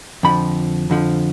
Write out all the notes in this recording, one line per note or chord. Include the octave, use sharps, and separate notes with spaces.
F2 D3 F3 B5
F2 D3 F3